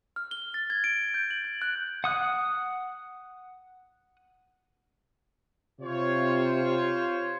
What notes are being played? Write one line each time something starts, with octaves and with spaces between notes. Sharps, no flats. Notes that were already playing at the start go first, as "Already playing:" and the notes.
F6
G7
A6
G#6
D7
G6
F#7
G6
F#6
F#5 D#6 F#6
C3 F4 C5 C#5